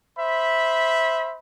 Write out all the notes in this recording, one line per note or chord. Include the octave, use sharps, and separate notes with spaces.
C5 E5 B5